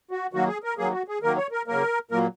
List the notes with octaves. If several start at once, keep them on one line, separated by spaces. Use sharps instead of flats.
F#4
D#3 F#3 A#3 F#4
G#4
A#4
D#3 F#3 A#3 G#4
F#4
G#4
D#3 F#3 A#3 A#4
C#5
A#4
C#3 F#3 A#3 A#4
A#2 F#3 A#3 A#4